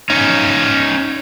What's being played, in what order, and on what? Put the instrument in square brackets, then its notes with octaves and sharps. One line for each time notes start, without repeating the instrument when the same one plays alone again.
[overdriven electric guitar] C#4 D#4